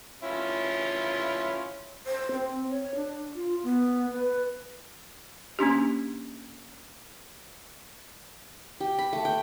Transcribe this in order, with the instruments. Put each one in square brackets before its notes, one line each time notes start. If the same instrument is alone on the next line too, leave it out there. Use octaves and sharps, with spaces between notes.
[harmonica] C#4 E4 F4
[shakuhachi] C5
C4
C#5
D4
F4
B3
B4
[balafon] A#3 C#4 D4 G4
[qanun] G4
B5
A3
G5